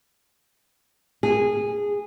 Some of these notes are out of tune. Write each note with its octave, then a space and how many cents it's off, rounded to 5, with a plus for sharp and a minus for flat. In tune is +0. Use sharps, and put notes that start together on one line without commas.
G#4 -15